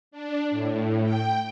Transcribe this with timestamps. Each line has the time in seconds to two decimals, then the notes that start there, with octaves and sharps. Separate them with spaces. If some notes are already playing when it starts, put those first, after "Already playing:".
0.11 D4
0.51 A2
1.03 G5